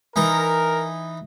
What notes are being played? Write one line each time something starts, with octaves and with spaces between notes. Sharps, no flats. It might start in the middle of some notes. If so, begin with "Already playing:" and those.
E3 D#4 A#4 A#5